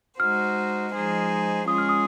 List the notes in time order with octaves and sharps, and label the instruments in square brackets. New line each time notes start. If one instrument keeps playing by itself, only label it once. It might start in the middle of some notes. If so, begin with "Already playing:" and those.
[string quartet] G#3 D#4 F#4 C5 [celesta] F6
[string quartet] F3 G#3 D#4 G#4 C5
[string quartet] G#3 C#4 F4 G#4 [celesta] D#6
[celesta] F6
D#6